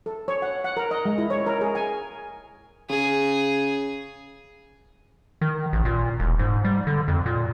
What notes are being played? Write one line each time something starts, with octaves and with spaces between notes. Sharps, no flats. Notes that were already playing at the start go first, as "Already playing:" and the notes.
A4
C#5
F#5
F#5
A#4
D#5
G#3
E4
C#5
A#4
G#4
G#5
C#3 G#4
D#3
A1
A#2
E1
G#2
G3
D3
F2
A#2